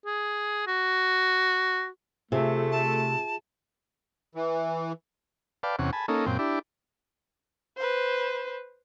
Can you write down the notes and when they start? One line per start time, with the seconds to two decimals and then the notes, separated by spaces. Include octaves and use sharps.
0.06 G#4
0.67 F#4
2.32 C3 A3 F4 G#4 E5
2.71 A5
4.35 E3
5.63 B4 D5 F5 G5 A5
5.79 E2 C3 C#4 F#5
5.93 G#5 A5 B5
6.08 A#3 C#4 D#4 A4
6.26 F#2 A#2 C4 G5
6.39 D4 E4 G4
7.77 B4 C5